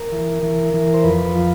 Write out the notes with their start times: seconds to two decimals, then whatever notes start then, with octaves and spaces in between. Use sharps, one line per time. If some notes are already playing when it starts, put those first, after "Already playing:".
Already playing: A#4
0.12 E3
0.43 E3
0.74 E3
0.94 C5
1.04 F2 B4
1.35 F3